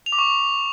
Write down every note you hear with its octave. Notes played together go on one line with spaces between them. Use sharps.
F7
D6
C#6